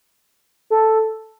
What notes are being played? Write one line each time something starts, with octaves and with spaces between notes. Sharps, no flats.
A4